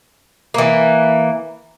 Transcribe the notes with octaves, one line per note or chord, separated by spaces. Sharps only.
E3 A#3